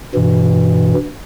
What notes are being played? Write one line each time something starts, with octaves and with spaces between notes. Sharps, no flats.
G2 B2 E3